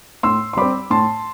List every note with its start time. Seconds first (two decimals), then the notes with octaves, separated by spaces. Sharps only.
0.23 A2 C6 E6
0.53 C6
0.57 G3 C4 B5 D6
0.90 A2 A5 C6